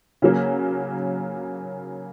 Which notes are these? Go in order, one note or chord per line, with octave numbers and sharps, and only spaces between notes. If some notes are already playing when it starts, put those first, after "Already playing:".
C#3 F#3 A#3